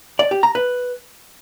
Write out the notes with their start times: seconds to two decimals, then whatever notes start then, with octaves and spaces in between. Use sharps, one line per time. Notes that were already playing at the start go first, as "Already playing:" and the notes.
0.19 D5
0.31 G4
0.43 A#5
0.55 B4